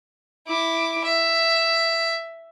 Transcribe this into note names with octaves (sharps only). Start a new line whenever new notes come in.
E4 D6
E5